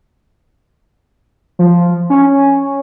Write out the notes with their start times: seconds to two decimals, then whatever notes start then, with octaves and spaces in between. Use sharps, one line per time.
1.59 F3
2.10 C#4